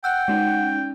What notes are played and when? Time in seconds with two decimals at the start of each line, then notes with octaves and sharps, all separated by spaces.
0.04 F#5 G5 E6 F#6
0.28 G#3 C#4 D#4